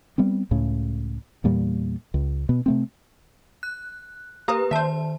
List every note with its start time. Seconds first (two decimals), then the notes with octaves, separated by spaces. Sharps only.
0.18 G3 B3 C4
0.51 C#2 A2 C#3
1.44 E2 A#2 G3
2.14 C#2
2.49 B2 B3
2.66 C3 A3 C4
3.63 F#6
4.48 A#3 G4 B4 A#5 D#6
4.71 D#3 C5 E5 A5